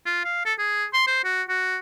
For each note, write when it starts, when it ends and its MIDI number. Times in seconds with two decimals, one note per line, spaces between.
0.06 0.22 65
0.25 0.44 77
0.45 0.54 69
0.59 0.86 68
0.94 1.04 84
1.07 1.24 72
1.24 1.43 66
1.49 1.78 66